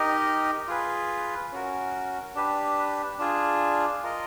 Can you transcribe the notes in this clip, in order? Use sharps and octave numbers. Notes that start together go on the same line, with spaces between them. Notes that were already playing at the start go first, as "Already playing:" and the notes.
Already playing: D#4 G4 A#4 D#5
F4 G#4 B4
C#4 F#4 A#4
D4 G4 B4
D4 F4 G#4
F4 A#4 D#5